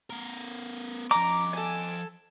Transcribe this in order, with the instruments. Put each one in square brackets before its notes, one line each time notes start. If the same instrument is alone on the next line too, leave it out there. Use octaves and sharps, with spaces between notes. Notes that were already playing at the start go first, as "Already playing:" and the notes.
[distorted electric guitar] B3 A#4
[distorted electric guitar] F3 D#5 [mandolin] A#5 [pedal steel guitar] D6
[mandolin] A4 G#5